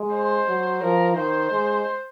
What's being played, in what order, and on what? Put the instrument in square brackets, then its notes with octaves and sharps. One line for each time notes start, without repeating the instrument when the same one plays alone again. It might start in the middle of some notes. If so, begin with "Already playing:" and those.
Already playing: [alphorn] G#3
[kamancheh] C5
[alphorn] F#3
[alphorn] F3 [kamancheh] A#4
[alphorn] D#3 [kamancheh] C5
[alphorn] G#3